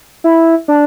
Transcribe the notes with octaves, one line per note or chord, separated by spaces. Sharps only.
E4
D4